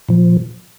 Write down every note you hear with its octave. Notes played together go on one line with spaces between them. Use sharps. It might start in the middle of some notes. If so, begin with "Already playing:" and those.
A#2 F3